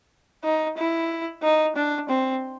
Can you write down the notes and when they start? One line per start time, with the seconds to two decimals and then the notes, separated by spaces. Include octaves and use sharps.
0.44 D#4
0.77 E4
1.43 D#4
1.75 D4
2.09 C4